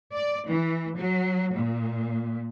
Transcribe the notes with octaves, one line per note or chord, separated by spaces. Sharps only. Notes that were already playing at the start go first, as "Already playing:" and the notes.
D5
E3
F#3
A#2